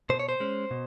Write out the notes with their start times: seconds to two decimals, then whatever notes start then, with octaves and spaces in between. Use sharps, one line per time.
0.10 B2 C5
0.20 C#5
0.29 C5
0.40 G#3 C#4
0.71 B2